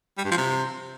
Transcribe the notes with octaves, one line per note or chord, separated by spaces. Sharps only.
G3
G2
F3
C3